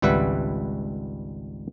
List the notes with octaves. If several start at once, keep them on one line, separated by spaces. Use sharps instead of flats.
G#1 C#2 G3 B4 E5 F#5